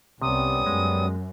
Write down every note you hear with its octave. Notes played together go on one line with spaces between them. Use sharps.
C2 C3 G3 B3 C#4 D#6
F#2 G#3